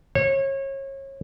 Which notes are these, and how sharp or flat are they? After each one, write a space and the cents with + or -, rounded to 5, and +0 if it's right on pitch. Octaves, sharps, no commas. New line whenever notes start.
C#5 -30